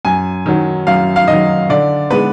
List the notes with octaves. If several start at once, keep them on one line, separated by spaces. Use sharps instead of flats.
F#2 G#5
D#3 F#3
F#2 F5
F5
D#3 D#5
F#3
D3 D5
G#3 B3 B4